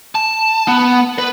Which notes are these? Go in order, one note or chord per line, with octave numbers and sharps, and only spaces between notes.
A5
B3
B4